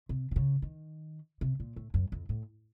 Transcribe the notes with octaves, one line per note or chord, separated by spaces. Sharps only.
C3
C3
C#3
D#3
C3
A#2
A2
F#2
F2
A2